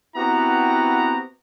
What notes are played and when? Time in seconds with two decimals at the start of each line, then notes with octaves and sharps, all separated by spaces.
0.16 B3 C4 E4 F#4 G4 A#5